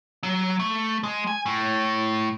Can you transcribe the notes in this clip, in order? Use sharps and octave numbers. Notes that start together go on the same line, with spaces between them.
F#3
A3
G#3
G#5
A2